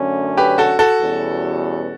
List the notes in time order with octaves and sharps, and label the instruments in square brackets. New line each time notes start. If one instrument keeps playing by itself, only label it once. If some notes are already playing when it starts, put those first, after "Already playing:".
Already playing: [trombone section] F#2 D3 A3 C#4
[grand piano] G4 B4
F#4 A4
F#4 A4
[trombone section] E2 B2 G3 C#4